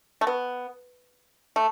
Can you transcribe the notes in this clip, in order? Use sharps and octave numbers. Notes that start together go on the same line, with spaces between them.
A3
B3
A3